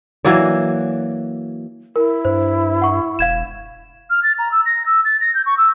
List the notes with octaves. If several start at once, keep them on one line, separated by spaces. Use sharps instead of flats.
E3 F#3 A#3 D5
E4 A#4
G2 C5
F#5 C#6
E1 F5 G#6 E7
F6
A6
A#5
E6
A#6
E6
A6
A#6
G6
C#6
E6